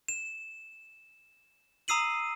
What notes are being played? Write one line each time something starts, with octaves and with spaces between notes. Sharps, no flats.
E7
A#5 D#6 E6 C7 D#7 F#7